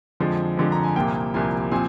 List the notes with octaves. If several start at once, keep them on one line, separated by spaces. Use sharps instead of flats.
F2 D3 F3 G#3
F2 D3 F3 G#3
A#5
G#5
C2 A#2 F3 A#3 G5
C2 A#2 F3 A#3 G#5
A#2 F3 C4 G#5